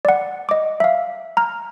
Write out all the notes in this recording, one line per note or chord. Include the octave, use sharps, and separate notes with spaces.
D5 F#5
D#5 D6
E5 F5
A#5 F6